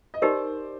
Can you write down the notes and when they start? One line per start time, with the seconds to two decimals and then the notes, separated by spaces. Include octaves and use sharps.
0.14 D#5
0.22 D#4 G4 A#4 C5 D5